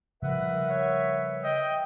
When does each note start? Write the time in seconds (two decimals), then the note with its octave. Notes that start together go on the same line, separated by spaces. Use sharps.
0.23 C#3 F3 G3 A#4 B4 E5 F#5
0.69 C#5
1.44 D#5 G5